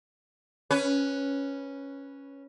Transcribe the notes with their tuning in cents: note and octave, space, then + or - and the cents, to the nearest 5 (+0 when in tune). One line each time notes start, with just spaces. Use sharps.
C#4 +0 B4 -5